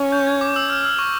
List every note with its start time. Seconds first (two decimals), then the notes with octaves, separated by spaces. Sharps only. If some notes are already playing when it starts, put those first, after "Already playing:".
Already playing: C#4
0.12 G6
0.27 G#6
0.41 D6
0.56 E6
0.70 F6
0.81 F6
0.85 E6
0.99 C#6